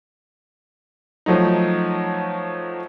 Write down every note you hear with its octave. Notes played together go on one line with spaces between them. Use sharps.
F3 F#3 A3 D#4